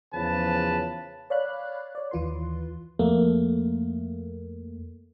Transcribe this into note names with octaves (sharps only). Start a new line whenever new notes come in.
E2 C#3 F3 B4 A5
C#5 D5 F5 B5 F#6
C#5 D5
D#2 E3 F4 B4 C6
F2 A3 A#3